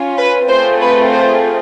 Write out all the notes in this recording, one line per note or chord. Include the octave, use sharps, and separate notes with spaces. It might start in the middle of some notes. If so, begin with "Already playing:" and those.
Already playing: C#4 F4
B4
A3 C4 F4 G#4 C5
B4
C5